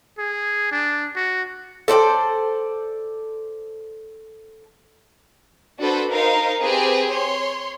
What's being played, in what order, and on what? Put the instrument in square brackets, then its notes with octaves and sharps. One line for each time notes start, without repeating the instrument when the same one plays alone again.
[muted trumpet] G#4
D4
F#4
[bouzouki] A4 C5 D5 G5
[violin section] D4 F#4 A4 B4 C5
D#4 A#4 C5 F5
C4 G4 G#4 B4
C#5 C6